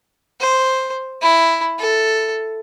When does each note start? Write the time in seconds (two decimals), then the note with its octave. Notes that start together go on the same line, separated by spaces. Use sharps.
0.40 C5
1.22 E4
1.79 A4